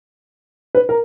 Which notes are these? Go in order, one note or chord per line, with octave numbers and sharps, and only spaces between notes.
B4
A#4